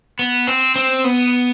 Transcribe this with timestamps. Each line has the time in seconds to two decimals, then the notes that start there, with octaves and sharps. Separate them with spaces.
0.19 B3
0.47 C4
0.76 C4
1.04 B3